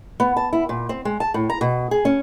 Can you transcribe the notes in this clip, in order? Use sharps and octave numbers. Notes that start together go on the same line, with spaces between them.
B3
A5
E4
A#2
C4
G#3
A5
A2
A#5
B2
G#4
C#4